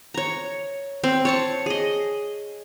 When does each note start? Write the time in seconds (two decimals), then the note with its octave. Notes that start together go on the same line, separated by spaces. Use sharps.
0.14 C#5 A#5
1.04 C4
1.25 C#5 A5 C#6
1.66 G#4 D#5